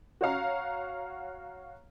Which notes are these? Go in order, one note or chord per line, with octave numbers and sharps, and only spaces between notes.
F#4 C#5 F5 A#5